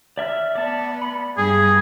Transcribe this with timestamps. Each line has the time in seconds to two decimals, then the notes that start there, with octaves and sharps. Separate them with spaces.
0.18 D5 E5 F6
0.55 B3 D5 A5
1.02 B5
1.38 G2 G#4